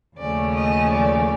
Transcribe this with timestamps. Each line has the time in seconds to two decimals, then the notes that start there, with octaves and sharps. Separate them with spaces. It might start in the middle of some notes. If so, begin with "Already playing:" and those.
0.18 D#2 C#3 F3 A3 C#4 D5
0.55 D#5
0.90 D5